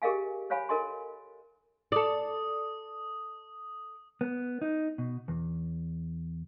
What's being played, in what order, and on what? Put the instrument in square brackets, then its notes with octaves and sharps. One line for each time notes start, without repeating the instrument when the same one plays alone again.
[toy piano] G4 G#4 A#4 D#5 F5 G#5
C5 C#5 F5 G#5 B5
A4 A#4 D#5 G#5 C6
[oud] A4 D5 [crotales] D#6
[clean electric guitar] B3
D#4
B2
E2